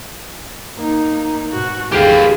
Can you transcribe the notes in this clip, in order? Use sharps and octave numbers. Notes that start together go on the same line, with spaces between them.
A#3 D#4
G#2 B2 F#4
G#1 E2 D3 G4 G#4 F5